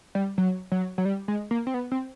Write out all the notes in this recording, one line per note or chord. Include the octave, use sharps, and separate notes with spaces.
G3
F#3
F#3
F#3
G3
G#3
A#3
C4
B3
C4